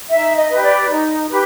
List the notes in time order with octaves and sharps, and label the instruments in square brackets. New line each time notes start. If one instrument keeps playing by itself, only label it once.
[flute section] D#4 E5
D#5
G4 B4
D5
D#4
G4 B4